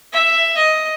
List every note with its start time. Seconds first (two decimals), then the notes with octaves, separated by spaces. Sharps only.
0.13 E5
0.57 D#5